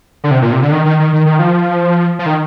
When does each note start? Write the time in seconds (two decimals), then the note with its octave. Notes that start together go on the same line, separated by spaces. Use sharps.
0.24 D3
0.31 C3
0.42 A#2
0.52 C3
0.62 D3
0.72 D#3
0.85 D#3
0.99 D#3
1.13 D#3
1.26 D#3
1.39 F3
2.19 F3
2.26 D#3